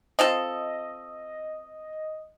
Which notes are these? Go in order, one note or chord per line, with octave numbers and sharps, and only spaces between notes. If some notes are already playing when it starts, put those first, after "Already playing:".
C4 F4 A4 D#5